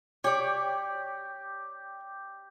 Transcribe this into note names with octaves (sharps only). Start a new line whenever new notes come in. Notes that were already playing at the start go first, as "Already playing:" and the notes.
G4 C#5 D5